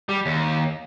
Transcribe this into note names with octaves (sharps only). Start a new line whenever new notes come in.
G3
D#2